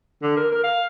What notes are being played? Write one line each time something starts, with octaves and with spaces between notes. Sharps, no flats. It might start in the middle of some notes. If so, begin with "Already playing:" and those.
D3
A#4
A#4
F5